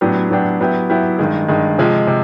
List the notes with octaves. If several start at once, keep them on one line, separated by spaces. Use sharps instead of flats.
A2 F#3 B3 D4 G4
A2 F#3 B3 D4 G4
F#3 B3 E4 G4 B4
F#3 B3 E4 G4 B4
G2 D#3 G#3
G2 D#3 G#3
C3 F3 G#3
C3